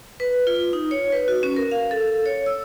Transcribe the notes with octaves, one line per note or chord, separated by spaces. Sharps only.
B4
F4
D#4
C#5
B4
F#4
C#4
A#4
F5
A4
C#5
E6